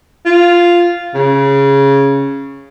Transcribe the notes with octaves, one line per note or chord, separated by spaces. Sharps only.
F4
C#3